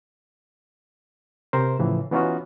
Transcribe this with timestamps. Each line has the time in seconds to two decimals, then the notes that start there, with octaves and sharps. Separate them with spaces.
1.53 C3 A#4 C5
1.79 A2 C#3 E3 F3
2.12 E3 B3 C#4 D#4 F4 F#4